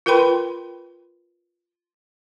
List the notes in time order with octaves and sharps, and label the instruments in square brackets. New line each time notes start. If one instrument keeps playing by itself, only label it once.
[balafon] F4 A#4 B4 G5 B5 C6